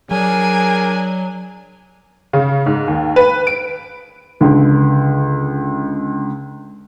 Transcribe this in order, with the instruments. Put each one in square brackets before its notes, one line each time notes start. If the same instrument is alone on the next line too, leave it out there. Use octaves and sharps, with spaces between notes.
[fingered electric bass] F#3 [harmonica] D4 G#4 A#4 [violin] G#5
[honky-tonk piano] C#3
G#2
D#2
B4
D7
[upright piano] C#2 D3